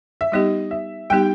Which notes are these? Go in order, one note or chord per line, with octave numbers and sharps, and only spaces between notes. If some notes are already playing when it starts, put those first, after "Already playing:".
E5
G3 B3 D#4 G4 D#5
E5
G3 B3 D#4 G4 G5